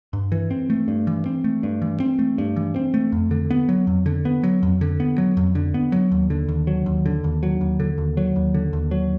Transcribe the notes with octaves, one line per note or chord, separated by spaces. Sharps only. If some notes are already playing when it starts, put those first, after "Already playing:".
G2
E3
C4
A3
G2
E3
C4
A3
G2
E3
C4
A3
G2
E3
C4
A3
F2
D3
B3
F#3
F2
D3
B3
F#3
F2
D3
B3
F#3
F2
D3
B3
F#3
D#2
D3
D#2
F#3
D#2
D3
D#2
F#3
D#2
D3
D#2
F#3
D#2
D3
D#2
F#3